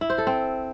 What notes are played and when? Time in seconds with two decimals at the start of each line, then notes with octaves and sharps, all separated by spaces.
0.01 E4
0.10 C5
0.18 A4
0.27 C4